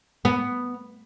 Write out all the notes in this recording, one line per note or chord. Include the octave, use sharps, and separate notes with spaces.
B3